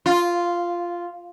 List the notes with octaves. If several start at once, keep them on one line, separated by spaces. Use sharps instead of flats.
F4